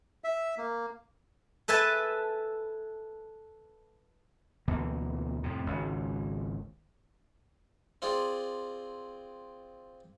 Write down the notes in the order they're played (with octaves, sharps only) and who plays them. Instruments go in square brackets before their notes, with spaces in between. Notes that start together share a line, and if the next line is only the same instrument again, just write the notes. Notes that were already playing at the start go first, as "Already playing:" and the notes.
[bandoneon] E5
A#3
[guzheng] A4 B4 E5 G#5 A5
[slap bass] D2 B2 E3 A#3
F2 A2 C3
G#1 C#2
[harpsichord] C4 F4 G#4 D5